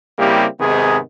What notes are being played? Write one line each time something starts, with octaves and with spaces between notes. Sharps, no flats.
C#3 G3 A#3 C4 E4 G4
G#2 C3 D#3 B3 G#4